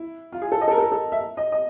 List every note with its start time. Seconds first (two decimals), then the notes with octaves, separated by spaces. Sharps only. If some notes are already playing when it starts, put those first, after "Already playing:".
Already playing: E4
0.32 F4
0.42 G#4
0.52 A4
0.61 D#5
0.68 A4
0.71 A#4
0.78 A4
0.82 A#4
0.92 A4
1.12 E5
1.37 D#5
1.52 D#5